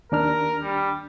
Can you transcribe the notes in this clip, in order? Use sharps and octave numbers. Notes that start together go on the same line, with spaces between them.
D#2 D4 A#4 F6
G3